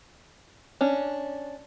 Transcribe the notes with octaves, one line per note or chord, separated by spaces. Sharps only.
C#4 D4